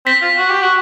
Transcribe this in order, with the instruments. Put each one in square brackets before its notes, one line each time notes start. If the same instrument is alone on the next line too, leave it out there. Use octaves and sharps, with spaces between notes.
[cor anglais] C4 [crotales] B6
[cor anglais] F4
F#4
G4
F#4